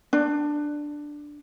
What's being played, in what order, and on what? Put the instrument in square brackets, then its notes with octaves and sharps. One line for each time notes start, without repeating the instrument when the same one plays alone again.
[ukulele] D4